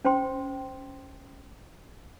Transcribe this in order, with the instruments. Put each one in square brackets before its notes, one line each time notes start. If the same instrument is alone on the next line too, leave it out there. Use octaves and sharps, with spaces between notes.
[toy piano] C#4 C5 G5 C6